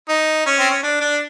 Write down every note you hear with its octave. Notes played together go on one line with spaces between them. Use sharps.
D#4
C#4
C4
C#4
D4
D4